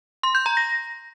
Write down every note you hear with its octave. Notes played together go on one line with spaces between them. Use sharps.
C6
G6
A#5
A#6